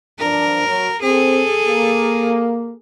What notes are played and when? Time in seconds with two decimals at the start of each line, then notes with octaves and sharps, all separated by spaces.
0.19 G2 F3 D4 A#4
0.66 F#3
1.02 C4 G#4 A4
1.66 A#3